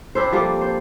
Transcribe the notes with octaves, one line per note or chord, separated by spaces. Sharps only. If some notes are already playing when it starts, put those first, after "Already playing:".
C4 D4 E4 C5
F3 G3 A#3 A4
C5